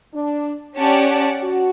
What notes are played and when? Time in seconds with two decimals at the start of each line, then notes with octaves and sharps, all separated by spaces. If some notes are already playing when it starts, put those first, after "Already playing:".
0.13 D4
0.77 C#4 G4 D5 F#5 A5
1.42 F#4